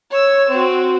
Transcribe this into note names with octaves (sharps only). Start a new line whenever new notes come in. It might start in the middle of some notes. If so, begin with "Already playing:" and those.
C#5 E6
C4 F#4